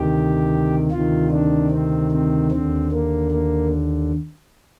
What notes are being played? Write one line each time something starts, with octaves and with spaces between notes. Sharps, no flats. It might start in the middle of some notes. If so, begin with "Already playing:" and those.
Already playing: D2 C3 D#3 G4
D2 C3 D#3 F4
D4
C4
C4
D#2 D3 C4
A#3
A#3